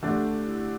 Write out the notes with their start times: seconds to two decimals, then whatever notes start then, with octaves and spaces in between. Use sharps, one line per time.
0.02 D3 A3 D4 G4
0.24 G4
0.46 E4